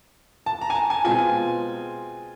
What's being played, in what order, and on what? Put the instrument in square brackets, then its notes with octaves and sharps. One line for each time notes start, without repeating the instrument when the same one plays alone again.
[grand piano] A5
A#5
G#5
A5
G#5
B2 G#3 C4 F4 G#5